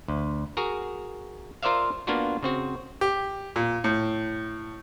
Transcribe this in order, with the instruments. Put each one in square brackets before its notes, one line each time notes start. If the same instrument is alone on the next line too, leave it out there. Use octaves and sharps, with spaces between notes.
[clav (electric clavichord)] D2
F#4 G#4 A#4
F4 A#4 C5 D5 E5 F5
A#3 B3 D4 F4 F#4
C#3 C4 F#4
[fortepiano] G4
A#2
A2